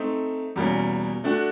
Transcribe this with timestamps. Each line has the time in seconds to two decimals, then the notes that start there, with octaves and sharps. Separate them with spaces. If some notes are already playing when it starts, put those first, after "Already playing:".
Already playing: A3 C4 D#4
0.56 E2 B2 G3 A#3 C#4
1.24 A3 D4 F#4